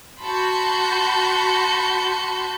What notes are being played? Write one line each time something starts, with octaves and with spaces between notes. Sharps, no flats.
F#4 A5 B5 C6 G6 C#7